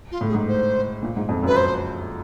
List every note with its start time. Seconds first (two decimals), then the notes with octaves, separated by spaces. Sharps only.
0.11 F4
0.21 A2
0.29 G#4
0.34 G#2
0.48 C5
1.03 A#2
1.16 G#2
1.29 F2
1.43 F#2 B4
1.57 C5